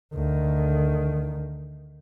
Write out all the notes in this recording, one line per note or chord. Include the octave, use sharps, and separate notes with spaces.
D2 D#3